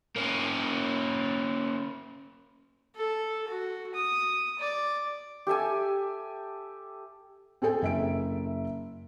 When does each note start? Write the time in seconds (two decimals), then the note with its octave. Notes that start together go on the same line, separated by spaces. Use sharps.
0.16 A#3 C#4
2.96 A4
3.48 F#4
3.95 D#6
4.59 D5
5.47 G4 A4 E5 G#5
7.62 C4 G#4 A4 G5 G#5
7.82 F#1 E5 D7